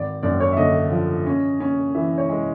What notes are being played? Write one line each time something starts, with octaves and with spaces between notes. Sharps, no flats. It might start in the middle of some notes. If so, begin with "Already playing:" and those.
Already playing: G#1 D5
F#2 D5
C#5
E5
D3 D#5
F3
C#4
C#4
E3 E5
C#5
G#3